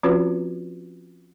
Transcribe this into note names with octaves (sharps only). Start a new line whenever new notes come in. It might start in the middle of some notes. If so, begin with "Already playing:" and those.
F3 C4 C#4 F4 F#4 B4